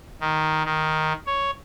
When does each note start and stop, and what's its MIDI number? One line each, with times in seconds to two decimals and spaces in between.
0.21 0.63 51
0.65 1.13 51
1.26 1.51 73